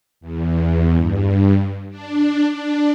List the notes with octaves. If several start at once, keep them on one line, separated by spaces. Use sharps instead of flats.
E2
G2
D4
D4